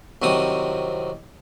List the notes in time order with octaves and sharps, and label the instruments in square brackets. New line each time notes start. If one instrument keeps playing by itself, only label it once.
[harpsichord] C2 D#3 F#3 C4 D#6